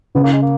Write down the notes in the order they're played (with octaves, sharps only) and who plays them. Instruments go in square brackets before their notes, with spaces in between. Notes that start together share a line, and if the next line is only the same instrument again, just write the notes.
[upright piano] C#3 [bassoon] B3
[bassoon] A#3
G#3
A#3